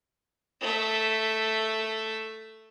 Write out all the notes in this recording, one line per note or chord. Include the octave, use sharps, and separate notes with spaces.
A3 E5